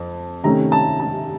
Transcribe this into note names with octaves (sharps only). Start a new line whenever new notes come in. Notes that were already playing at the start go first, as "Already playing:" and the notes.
Already playing: F2
C3 D#3 A3 C#4 A#5
A5
A5